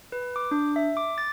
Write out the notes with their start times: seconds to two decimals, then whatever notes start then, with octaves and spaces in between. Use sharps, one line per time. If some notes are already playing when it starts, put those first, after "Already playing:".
0.12 B4
0.36 D6
0.51 D4
0.76 E5
0.97 D6
1.18 A6